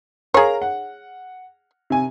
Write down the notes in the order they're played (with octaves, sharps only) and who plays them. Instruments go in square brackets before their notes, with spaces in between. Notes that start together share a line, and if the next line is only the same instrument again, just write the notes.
[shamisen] G#4 C#5 [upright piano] A#4 F5 A#5
[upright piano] F#5
C3 G#5